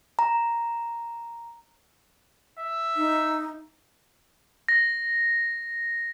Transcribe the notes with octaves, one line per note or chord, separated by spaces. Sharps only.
A#5
E5
D#4
A#6